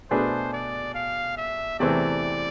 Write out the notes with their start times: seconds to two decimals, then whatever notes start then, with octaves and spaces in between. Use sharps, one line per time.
0.10 B2 A3 D4 G#4 B4 C5
0.53 D5
0.95 F5
1.37 E5
1.80 E2 C3 E3 A3 C4 D5